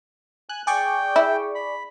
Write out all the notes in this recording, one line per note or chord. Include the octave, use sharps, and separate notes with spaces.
G#5 F#6
G#4 D5 G5 C#6
E4
B5